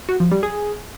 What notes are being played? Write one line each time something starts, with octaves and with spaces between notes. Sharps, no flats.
F#4
F3
G3
G#4